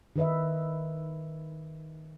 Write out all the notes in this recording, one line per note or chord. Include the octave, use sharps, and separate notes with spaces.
D#3 D#4 B4 D#5 E5